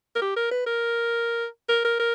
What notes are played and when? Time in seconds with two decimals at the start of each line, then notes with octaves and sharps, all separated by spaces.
0.16 A#4
0.22 G4
0.36 A#4
0.51 B4
0.67 A#4
1.69 A#4
1.85 A#4
2.00 A#4